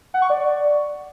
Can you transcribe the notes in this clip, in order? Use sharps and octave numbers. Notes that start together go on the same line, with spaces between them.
F#5
C#6
D5